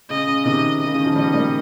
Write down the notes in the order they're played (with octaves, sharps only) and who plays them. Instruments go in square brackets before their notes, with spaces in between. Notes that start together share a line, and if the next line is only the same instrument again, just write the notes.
[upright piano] C#3 [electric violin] D#5
[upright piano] C#3
[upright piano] C3 D#3 [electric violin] D#5
[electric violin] D#5
[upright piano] C#3
D#3
F3
[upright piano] D#3 G3 [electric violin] D#5
[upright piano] G3 A#3